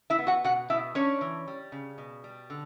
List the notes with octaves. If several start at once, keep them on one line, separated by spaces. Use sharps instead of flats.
E4 E5
B3
F#4 F#5
B2 F#4 F#5
B2 E4 E5
C#4 D4 C#5
E3
G3
C#3
B2
G3
D3